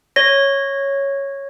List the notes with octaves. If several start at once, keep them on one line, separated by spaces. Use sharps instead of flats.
C#5 A#6